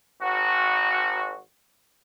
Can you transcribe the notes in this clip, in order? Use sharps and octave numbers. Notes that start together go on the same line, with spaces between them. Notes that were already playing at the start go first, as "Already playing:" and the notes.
G#1 F#4